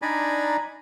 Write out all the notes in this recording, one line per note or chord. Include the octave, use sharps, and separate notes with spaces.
D4 D#4 D5 G#5 A#5 B5